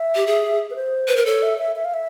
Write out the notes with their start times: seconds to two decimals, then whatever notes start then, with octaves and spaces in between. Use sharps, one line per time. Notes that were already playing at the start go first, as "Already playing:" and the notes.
Already playing: E5
0.15 G4
0.27 G#4
0.71 B4
0.76 C5
1.08 B4
1.16 A#4
1.26 A4 C#5
1.43 E5
1.58 E5
1.76 E5
1.85 F5
1.94 E5